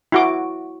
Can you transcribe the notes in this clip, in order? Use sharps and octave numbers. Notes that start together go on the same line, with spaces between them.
E4 F#4 D6